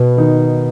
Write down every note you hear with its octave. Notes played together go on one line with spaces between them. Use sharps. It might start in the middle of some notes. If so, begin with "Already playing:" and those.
Already playing: B2 B3
D#3 D#4